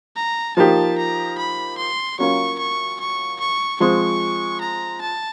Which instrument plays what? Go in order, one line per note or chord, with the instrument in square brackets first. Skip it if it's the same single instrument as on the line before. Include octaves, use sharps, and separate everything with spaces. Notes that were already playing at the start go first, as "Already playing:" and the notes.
[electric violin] A#5
[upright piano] F3 A#3 D#4 G4 [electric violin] A5
[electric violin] A#5
B5
C6
[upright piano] F#3 A#3 C#4 F4 [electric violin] C#6
[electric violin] C#6
C#6
C#6
[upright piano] F3 G#3 C4 [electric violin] C#6
[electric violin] A#5
A5